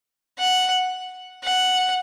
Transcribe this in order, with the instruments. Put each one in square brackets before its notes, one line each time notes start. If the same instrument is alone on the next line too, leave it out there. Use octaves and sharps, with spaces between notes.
[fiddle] F#5
F#5